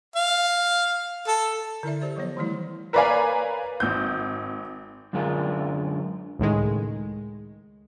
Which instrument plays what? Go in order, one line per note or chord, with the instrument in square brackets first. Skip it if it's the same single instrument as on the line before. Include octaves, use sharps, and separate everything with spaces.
[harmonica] F5
A4
[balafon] D3 E4 A4 D5 E5
G4 C5 D5
F3 F#3 B3 C#5
D#3 E3 G3 A3 E4
[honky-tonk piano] A#4 B4 C#5 D5 F5 G#5
G#1 G6
[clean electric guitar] F#2 D3 G#3 D4 F4 A#4
[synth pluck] C#2 A2 D#3 G#3